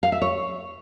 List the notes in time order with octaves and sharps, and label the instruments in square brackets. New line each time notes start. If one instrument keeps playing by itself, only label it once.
[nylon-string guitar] F5
E5
C#5